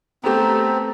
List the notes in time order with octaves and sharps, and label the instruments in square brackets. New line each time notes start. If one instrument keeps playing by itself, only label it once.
[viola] A3 [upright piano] B3 G4 [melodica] C4 [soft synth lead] A#5